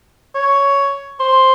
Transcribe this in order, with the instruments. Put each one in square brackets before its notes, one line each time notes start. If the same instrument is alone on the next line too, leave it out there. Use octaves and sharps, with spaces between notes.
[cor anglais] C#5
C5